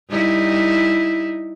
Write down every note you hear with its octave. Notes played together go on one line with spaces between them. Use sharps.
G3 D#4 E4